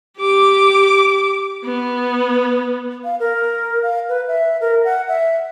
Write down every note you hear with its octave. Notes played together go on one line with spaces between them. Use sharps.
G4 D6
B3
F5
A#4
F5
B4
E5
A#4
F#5
E5